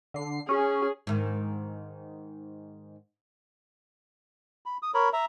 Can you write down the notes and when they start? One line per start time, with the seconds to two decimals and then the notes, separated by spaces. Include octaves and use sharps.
0.14 D3 C7
0.49 C#4 G#4
1.07 G#2 D#3
4.66 B5
4.82 D#6
4.94 A#4 C#5 B5
5.13 E5 A#5